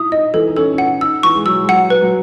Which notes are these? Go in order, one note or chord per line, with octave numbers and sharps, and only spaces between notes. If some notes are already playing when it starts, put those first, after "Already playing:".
Already playing: D#4 E4 D#6
D#4 D#5
E3 A4
D#4
C#4 A4
C#4
D#4 F#5
D#4 E6
E3 C#6
G#3
F#3 E6
G#3
F#3 F#5
B4
F#3